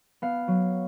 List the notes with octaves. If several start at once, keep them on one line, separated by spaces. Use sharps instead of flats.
B3 F5
F#3